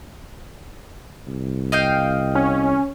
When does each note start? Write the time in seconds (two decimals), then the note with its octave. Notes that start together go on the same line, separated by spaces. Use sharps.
1.27 C2
1.72 D#5 F5 G5
2.35 C#4